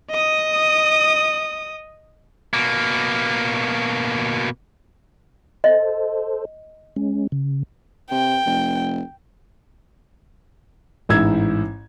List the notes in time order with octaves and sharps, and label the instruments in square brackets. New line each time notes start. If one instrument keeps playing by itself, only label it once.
[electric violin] D#5 D#6
[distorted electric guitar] B2 A#3
[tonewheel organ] A4 C5 [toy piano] D#5
[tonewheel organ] G#3 C#4
C#3
[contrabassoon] C3 [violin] G5
[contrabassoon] F1
[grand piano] A1 G#2 E4 E6 G#6